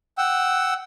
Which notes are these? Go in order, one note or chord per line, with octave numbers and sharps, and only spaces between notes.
F#5 G5 E6